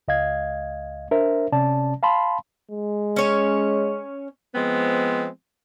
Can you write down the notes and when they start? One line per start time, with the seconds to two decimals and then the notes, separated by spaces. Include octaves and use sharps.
0.08 C#2 D#5 F5 G#6
1.11 D4 A#4 C5 E5
1.52 C3 C#4 D5 A5
2.03 F5 A5 B5 C6
2.71 G#3
3.16 C#4 C#5
4.55 F3 G#3 B3 C4